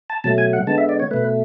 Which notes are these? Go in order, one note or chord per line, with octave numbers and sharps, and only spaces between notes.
A5
B2 F#3 A3 A5
G#5
F#5
D3 G#3 B3 A5
E5
D5
C#5
B2 A3 B4